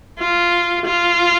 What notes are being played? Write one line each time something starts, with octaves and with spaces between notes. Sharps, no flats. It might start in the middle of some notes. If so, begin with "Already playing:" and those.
F4
F4